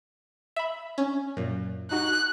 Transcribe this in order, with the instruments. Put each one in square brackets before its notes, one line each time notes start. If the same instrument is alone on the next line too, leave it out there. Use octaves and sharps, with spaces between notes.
[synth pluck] E5 B5
C#4
F#2 A#2
[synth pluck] D#4 F#4 [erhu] F#6